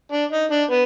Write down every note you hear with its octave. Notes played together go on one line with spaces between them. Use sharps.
D4
D#4
D4
B3